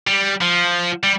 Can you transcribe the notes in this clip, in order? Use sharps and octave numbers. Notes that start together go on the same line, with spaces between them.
G3
F3
G3